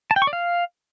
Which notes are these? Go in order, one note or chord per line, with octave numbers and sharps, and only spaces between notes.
A5
G5
C#6
D5
F5